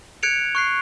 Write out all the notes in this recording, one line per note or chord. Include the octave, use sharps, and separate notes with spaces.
F#6 G#6 C#7 D7 F7
C#6 F#6 C7